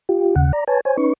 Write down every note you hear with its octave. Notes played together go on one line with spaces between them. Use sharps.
F4 G4
D#2 C#3 F#5
D5 A#5
B4 C#5 G#5 A5
C5 C#5 G#5
C#4 D#4 B4 C#6